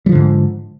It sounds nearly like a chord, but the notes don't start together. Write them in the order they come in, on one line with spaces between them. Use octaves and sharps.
G3 F3 D3 G#2